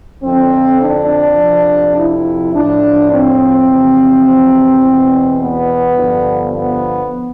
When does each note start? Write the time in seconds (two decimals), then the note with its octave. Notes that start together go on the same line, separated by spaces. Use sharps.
0.22 F2 D3 F3 C4
0.80 D4
1.38 F2 C3 F3
1.95 E4
2.52 A2 F3 D4
3.09 C4
3.66 E2 C3 F3
4.81 E2
4.86 B2
5.39 B3
5.96 G2 D3 F3
6.53 B3